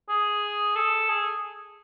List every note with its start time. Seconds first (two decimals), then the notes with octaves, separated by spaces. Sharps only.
0.09 G#4
0.76 A4
1.09 G#4